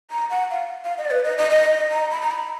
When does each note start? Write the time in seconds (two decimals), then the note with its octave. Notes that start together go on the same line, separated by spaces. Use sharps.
0.11 A#5
0.30 F#5
0.51 F5
0.85 F5
0.98 D#5
1.05 D5
1.11 B4
1.25 D#5
1.38 D#5
1.51 D#5
1.91 A#5
2.11 B5
2.21 A#5
2.31 B5